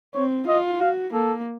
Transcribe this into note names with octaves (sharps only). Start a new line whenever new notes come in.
C4 C#5
F4 D#5
F#4 F5
A#3 A4